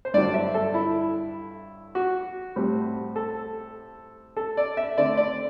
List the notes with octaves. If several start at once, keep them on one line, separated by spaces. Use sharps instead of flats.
C5
G2 D3 F#3 D5
E5
A4
E4
F#4
A2 G3 C4
A4
A4
D5
E5
D3 A3 C4 D5
D5